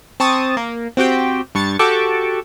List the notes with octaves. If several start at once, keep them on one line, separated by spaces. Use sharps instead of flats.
C4 A5 C#6 D#6 A6
A#3
C4 F#4 G4 G5
G2 C#6 A6 C#7
F#4 G4 A4 A5 C#6 D6